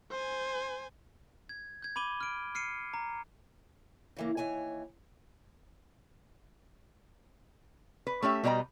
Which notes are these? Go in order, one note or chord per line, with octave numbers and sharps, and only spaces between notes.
C5 G#5
G#6
G6 G#6
B5 D6 D#7 G7
F6 D7
F6 C7 C#7 D#7
A#5
C#3 E3 A#3
D#2 E3 C#5 G#5
B4
A3 C#4 G4 E5
B2 G3 G4 D#5 A#5